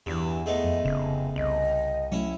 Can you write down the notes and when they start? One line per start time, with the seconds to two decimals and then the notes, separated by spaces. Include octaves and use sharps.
0.06 E2 G2 E3
0.46 G#3 A3 B3 D#5
0.64 F2
0.85 F1 C#3
1.36 C2 D#5
2.12 F#3 G#3 A3 C#4 E4